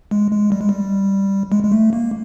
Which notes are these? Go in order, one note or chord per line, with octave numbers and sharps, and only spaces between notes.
G#3
G#3
G3
G#3
G3
G#3
G#3
A3
A#3